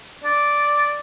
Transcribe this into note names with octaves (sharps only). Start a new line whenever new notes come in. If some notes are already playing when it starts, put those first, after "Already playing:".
D5